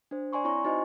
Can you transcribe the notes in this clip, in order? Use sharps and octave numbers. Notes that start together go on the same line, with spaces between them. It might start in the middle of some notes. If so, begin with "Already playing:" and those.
D4 C5
D5 G#5 C6 C#6
C4 E4 C#5 A#5 C6 C#6
D#4 F#4 C5 D#5 G#5